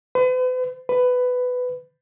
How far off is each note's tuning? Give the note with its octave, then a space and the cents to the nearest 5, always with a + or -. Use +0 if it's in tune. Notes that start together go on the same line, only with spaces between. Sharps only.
B4 +45
B4 +15